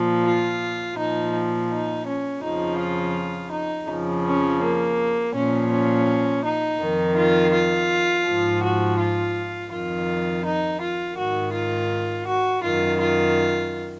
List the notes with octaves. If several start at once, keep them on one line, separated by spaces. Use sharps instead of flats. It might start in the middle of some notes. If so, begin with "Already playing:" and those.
Already playing: A#2 F3
F4
A#2 F3 D#4
D#4
C#4
F2 C#3 F3 D#4
F4
D#4
F2 C#3 F3
C#4
A#3
A#2 F3 C#4
C#4
D#4
F2 D#3
F4
F4
G#2 F3
F#4
F4
F2 D#3 F4
D#4
F4
G#2 D#3 F#4
F4
F#4
F#2 D#3 F4
F4